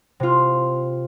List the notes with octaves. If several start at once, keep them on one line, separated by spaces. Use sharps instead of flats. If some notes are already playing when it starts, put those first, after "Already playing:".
C3 F4